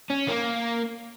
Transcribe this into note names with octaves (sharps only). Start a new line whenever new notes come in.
C#4
A#3